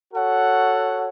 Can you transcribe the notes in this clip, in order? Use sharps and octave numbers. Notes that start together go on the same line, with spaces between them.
F#4 A4 C#5 F#5